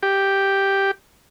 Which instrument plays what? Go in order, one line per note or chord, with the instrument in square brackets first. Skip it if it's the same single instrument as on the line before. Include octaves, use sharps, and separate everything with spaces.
[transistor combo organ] G4